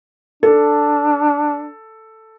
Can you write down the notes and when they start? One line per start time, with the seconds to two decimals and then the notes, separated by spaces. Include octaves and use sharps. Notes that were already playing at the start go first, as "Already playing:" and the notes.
0.43 D4 A4